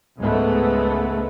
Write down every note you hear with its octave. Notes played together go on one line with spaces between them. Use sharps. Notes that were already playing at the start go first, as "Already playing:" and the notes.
C#2 G#2 G#3 A3 B3